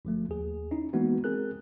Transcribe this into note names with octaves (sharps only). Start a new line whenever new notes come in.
G1 F3 A3
D#2 G#4
C#4 D#4 E4
E3 G#3 A#3 B3 D#4 F#4
C4 G#4 A#4 F#6